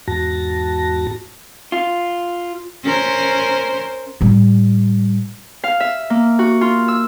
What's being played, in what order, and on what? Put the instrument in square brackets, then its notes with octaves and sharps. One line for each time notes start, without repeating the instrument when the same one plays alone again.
[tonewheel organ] E2 G#2 F#4 A5 A#6
[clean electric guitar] F4
[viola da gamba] C#4 A#4 C5
[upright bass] A2 G3
[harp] F5
E5
A#3
F#4
F4
E6